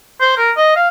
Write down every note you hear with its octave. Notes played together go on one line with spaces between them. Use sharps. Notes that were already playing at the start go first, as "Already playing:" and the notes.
C5
A#4
D#5
F5